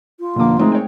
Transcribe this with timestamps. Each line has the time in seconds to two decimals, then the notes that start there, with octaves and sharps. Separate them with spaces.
0.20 F4
0.36 F1 B2 D3 A#3 D6
0.59 G#3 A3 C4 C#4 D#4 A#4
0.72 C#5 G5